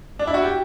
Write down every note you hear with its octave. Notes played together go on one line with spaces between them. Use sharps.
D4
E4
F#4
G4